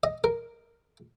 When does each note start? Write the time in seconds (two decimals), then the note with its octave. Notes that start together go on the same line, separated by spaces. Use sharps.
0.03 D#5
0.24 A#4